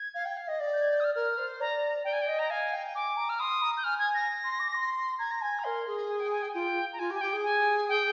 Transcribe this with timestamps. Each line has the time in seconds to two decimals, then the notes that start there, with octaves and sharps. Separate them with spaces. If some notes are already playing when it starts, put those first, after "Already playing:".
Already playing: G#6
0.14 F5
0.25 G5
0.37 F5
0.48 D#5
0.60 D5
0.73 G6
0.81 G#6
0.93 G6
1.00 D#6
1.04 F6
1.15 A#4 F6
1.38 C5
1.60 D5 A#5
2.04 D5 G5
2.13 G#5
2.21 G5
2.27 D#5
2.39 A#5
2.50 F5 G#5
2.73 G5
2.95 G#5 D6
3.17 A#5
3.29 F6
3.40 C6 D#6
3.62 A#5
3.77 G6
3.84 G#5 F6
3.99 G#6
4.14 A#6
4.44 C6
4.59 D6
4.74 C6
5.19 A#5 G#6
5.31 A#6
5.41 G#5 G#6
5.59 A#5
5.64 A#4 C6
5.87 G#4
6.09 G#5
6.20 G5
6.31 G#5
6.42 G5
6.49 G#5
6.54 F4 G5
6.93 A#5
6.99 F4 G#5
7.10 G4
7.15 G#5
7.21 G4 G5
7.33 G#4
7.44 G#5
7.89 G5